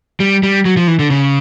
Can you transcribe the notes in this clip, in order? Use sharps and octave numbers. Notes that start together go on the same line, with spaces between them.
G3
G3
F#3
F3
E3
D3
C#3